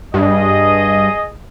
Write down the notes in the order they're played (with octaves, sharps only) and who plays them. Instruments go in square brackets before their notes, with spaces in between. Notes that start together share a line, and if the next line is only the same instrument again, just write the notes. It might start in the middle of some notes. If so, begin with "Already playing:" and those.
[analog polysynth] G2 [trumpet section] G#4 D#5